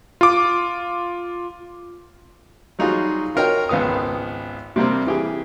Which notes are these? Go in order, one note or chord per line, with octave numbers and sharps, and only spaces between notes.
F4 D6
F#3 G3 D#4 F4 F#4 G#4
F4 F#4 A#4 C#5 D#5 G5
G#1 C#2 B3 F5 D#6
C3 G3 A#3 C4
E3 G4 G#4